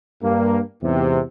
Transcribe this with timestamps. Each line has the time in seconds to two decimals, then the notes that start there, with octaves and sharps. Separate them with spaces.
0.22 G2 A#3
0.83 E2 G#2 C3